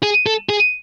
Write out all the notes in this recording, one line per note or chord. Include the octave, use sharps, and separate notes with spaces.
G#4
A4
G#4